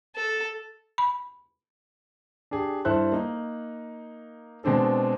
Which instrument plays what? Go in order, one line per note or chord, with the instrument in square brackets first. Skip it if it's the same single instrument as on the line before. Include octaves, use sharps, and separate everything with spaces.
[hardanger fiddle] A4
[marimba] B5
[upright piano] D4 G4 G#4
G2 E4 A4 C5 F#6
A#3 D#4
B2 G#3 C4 D4 A4